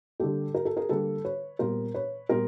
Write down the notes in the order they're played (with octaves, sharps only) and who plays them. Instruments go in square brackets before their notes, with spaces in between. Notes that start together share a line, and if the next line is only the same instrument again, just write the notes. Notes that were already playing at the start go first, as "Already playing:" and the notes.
[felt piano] D3 G3 A#3 G4 A4
A#4
A4
G#4 A#4
D3 G3 A#3 A4 B4
B4 C#5
A#2 G3 B3 A#4 C5
B4 C#5
A#2 G3 B3 A#4 C5